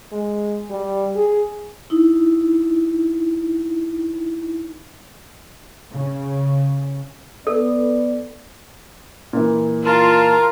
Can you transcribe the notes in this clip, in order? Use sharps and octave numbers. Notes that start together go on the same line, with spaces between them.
G#3
G3
G#4
D#4 E4
C#3
B3 A4 B4 D5
A#2 E3
F4 A#4 A5